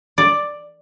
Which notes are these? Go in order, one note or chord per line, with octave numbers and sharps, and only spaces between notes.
D5